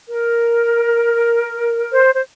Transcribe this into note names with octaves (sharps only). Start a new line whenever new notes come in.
A#4
C5
C5